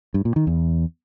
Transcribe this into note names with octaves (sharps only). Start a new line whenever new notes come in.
G2
A#2
D#3
E2